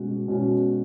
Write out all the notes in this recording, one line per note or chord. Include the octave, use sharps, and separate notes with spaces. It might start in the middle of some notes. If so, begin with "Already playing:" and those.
Already playing: B2 G#3 C#4 F#4
B2 G#3 C#4 F#4